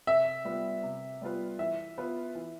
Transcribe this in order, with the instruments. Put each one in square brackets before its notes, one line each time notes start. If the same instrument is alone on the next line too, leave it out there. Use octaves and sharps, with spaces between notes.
[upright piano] C3 [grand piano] E5
[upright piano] G3 B3 F4 B4
C3
G3 B3 F4 B4
[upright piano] E3 [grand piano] E5
[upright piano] B3 F4 B4
E3